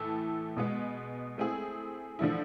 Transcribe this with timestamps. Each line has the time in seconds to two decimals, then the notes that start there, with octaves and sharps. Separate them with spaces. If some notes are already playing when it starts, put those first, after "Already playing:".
Already playing: A2 E3 A3 E4 A4
0.56 B2 G#3 B3
1.38 A3 C4 E4 G#4
2.19 D3 F3 A3 E4